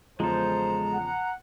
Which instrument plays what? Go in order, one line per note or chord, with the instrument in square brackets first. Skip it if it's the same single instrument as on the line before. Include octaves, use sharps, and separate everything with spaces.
[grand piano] E2 C#3 F3 [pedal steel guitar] G#3 A4 [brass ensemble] C5 [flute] A#5
[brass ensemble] F#5